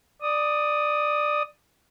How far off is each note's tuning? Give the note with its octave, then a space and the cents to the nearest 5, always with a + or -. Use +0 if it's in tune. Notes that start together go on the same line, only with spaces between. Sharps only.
D5 +15 D#6 +0